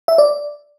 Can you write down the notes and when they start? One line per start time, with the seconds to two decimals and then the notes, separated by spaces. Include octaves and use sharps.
0.08 E5
0.18 D5